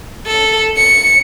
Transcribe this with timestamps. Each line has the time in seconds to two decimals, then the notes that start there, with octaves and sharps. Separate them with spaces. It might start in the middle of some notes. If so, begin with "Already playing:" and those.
0.27 A4
0.77 C#7